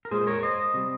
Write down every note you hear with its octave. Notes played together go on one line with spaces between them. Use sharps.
A#4
A#2 G#3 G#4 C5
C5
A#4 C#5
C5 D#5
C3 G3